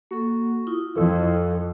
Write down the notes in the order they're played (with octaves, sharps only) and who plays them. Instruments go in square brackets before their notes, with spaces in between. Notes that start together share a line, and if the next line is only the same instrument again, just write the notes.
[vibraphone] A#3 A4 [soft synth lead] F#4
[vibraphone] E4 F4 D#6
[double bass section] F2 [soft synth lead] A4